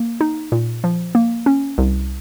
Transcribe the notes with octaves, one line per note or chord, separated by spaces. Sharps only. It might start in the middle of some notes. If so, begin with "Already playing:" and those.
Already playing: A#3
D#4
A#2
F3
A#3
C#4
C2